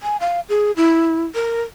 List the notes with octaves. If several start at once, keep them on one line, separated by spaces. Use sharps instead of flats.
G#5
F5
G#4
E4
A#4